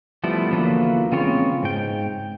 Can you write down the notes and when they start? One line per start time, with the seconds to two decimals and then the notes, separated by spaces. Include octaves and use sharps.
0.24 F3 G3 A3 B3 E4
0.51 E2 D3 F3 F#3 A#3 B4
1.11 C#3 G#3 B3 C4 F4 C#5
1.63 G#2 G5